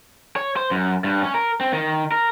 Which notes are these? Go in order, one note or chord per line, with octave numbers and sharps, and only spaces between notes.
C#5
C5
F#2
G2
C#4
A#4
C4
D#3
A#4